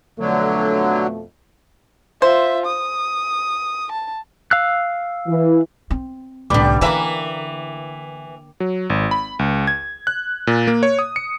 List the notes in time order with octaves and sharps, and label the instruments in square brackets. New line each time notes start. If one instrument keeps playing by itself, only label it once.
[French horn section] F2 B2 A3 [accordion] D3 F#3
[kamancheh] F4 E5 [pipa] C5
[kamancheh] D#6
A5
[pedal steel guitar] F5 E6 F#6
[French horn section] E3
[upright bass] C4
[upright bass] C2 A2 [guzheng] D3 B3 [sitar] G3 [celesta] G5 D6
[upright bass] D3 [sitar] E3 E5 [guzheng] A#3 A#4 B4
[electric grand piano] F#3
G#1
B5
C#2
G#6
F#6
A#2
A#3
C#5
D#6
C#7